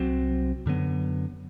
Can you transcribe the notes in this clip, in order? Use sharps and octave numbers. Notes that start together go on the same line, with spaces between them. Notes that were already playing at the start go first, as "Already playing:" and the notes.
Already playing: C2 C3 F#3 C4
F#2 D3 F#3 B3